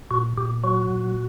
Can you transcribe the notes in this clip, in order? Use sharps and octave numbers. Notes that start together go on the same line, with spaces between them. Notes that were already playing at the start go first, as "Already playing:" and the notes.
A#2 F#4
A#2 G4
F#3 F#4
A#2